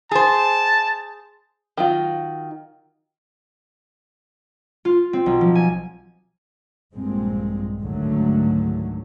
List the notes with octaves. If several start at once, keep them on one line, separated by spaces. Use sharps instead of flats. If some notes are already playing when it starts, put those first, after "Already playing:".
G#4 C5 A5
D#3 F#3 F4
F4
C4
B1
F3
G#5
A#1 G2 A#2 G#3 C4
C#2 G#2 D3 D#3 F#3 A3